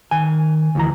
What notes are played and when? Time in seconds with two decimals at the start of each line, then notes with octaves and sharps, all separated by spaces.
0.11 D#3 G#5
0.75 D2 E3 A#5